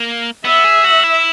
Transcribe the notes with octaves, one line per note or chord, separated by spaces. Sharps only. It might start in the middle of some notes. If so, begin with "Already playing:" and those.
Already playing: A#3
B3 E5
G#4
F#4
E4